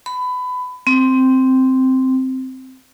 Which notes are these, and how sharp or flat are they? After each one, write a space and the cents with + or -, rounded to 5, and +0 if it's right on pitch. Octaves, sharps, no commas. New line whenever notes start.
B5 +20
C4 -5